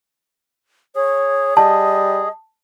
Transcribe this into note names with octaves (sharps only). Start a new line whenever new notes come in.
G#4 C#5
G3 D#5 A5